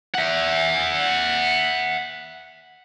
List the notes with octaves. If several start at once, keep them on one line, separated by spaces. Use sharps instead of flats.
E5 F#5